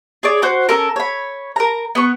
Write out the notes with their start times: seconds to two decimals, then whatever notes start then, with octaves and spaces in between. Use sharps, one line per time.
0.23 G#4 C#5 D5
0.42 F#4 C5 G6
0.69 C#4 A4 A#4
0.96 C#5 B5
1.56 A#4 A#5
1.95 B3 C#6